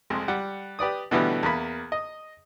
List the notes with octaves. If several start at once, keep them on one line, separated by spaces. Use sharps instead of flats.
C2 F2 G#3
G3 F#5
G4 B4 D5 D#6
B2 D3 E3 G3 A3 B3
E2 A#3 B5
D#5